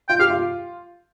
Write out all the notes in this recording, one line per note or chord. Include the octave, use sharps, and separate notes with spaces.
F4 G5
G4 F5
F4